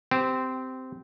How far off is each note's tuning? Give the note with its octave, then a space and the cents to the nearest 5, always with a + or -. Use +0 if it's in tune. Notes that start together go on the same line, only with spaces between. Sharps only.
C4 -15 G4 +0